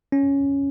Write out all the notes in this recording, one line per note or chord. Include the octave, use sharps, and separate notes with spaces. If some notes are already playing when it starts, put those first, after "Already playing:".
C#4